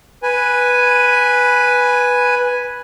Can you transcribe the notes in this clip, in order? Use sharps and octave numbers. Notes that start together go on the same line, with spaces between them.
B4 G#5